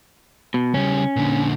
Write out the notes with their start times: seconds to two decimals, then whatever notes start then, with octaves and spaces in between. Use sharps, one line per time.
0.54 B2
0.74 C#3 G3 C#4
1.16 A#2 D3